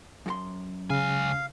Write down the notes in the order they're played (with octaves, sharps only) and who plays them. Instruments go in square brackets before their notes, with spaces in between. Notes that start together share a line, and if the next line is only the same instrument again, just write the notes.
[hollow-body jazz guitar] F#2 F#4 C6
[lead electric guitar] C#2 G#5 [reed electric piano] C#3 [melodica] F5